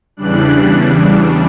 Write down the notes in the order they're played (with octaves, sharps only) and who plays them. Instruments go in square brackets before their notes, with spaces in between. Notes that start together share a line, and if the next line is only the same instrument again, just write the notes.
[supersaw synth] E2 C#3 E3 G3 D4 F#6